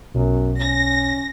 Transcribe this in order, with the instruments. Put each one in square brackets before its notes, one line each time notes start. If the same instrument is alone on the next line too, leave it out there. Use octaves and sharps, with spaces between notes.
[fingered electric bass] B1 [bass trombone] F#2
[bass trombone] C#4 [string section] A#6